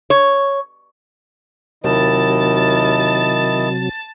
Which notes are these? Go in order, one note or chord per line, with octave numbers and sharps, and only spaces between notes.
C#5
D#2 C3 D#3 F#3 E4 D#5 A5 A6